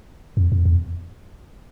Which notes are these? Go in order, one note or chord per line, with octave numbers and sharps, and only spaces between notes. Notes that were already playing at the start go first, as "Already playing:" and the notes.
F2
F2
E2